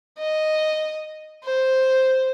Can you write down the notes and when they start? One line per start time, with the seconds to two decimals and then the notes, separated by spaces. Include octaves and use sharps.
0.18 D#5
1.44 C5